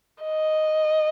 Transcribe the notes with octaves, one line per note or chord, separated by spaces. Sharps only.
D#5